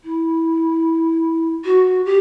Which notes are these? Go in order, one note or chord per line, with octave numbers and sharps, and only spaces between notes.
E4
F#4
G4